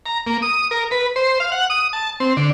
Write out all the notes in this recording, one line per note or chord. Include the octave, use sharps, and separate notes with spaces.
A#5
A#3
D#6
A#4
B4
C5
F5
F#5
D#6
A5
C4
D3